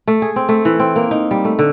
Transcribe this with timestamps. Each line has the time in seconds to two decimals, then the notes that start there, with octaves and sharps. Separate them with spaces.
0.07 A3
0.22 G#4
0.36 C4
0.49 A3
0.65 E3
0.80 C4
0.96 A#3
1.11 D#4
1.31 G3
1.45 A3
1.59 D3